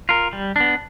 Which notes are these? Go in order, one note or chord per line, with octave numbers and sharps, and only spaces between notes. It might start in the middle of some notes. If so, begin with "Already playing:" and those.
F4 A#4
G3
B3 D4